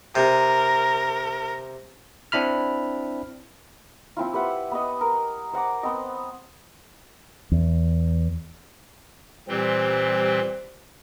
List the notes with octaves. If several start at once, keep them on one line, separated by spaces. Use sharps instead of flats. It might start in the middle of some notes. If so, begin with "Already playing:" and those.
C3 A#4
C4 D4 E4 B5 F6
F3 C4 E4 F4
G4 B4 E5 F#5
B3 B4 D#5
A#4
C5 F#5 A#5 D6
B3 C4 D#5
E2
A#2 E3 G3 C4 C5